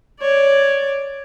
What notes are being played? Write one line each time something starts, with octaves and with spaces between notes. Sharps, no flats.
C#5 D5